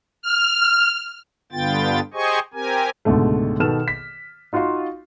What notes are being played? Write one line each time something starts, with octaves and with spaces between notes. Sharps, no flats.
F6
G2 D3 B3 F4 G5 A6
G4 G#4 C5 D#5 G#5 C#6
C4 G4 A#4 G#5
C#2 G#2 B2 D3 A3
B2 D#3 B3 A4 F6 E7
B6
D#4 F4 F#4 F5 C6